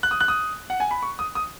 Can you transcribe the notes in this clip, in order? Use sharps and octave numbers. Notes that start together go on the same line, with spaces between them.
F#6
D#6
F#6
D#6
F#5
G#5
B5
C#6
D#6
D#6